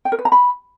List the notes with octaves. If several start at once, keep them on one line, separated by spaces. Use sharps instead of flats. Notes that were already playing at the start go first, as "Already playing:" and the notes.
G5
A#4
B4
A#5
B5